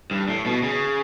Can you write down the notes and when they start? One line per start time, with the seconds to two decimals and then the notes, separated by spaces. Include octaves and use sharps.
0.11 G2
0.29 A2
0.46 B2
0.64 C#3